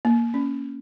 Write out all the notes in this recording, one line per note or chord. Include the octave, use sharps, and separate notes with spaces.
A#3
C#4